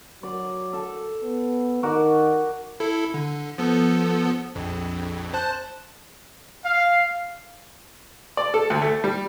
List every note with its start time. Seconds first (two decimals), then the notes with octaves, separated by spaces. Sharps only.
0.23 F#3 D5
0.73 A4
1.23 B3
1.83 D#3 F#4 A#4 D5
2.80 E4 A4
3.14 D3
3.58 F3 B3 A4
4.55 A#1 F2
5.34 C5 A5 F#6
6.64 F5
8.37 D5
8.54 A4
8.70 D2
8.82 A3
9.04 G3